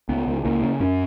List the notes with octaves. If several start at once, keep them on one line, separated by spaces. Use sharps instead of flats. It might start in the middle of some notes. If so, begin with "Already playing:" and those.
C#2 B3
C#2
C#2 A#3
C#3
F#2 C#4